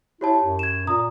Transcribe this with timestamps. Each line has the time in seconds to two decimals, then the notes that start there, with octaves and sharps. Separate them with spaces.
0.21 E4 G4 C#5 A5
0.43 F#2
0.59 G#6 E7
0.87 A#2 A#5 D#6